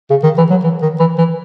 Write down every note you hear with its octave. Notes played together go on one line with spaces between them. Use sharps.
C#3
D#3
E3
F#3
E3
D#3
E3
E3